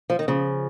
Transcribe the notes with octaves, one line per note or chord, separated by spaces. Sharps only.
F3
D#3
C#3 F3